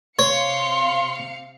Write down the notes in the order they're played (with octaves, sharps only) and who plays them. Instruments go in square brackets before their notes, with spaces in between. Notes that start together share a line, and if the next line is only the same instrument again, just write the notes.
[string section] C3 F5 C#7 [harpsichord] C#5 [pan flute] C6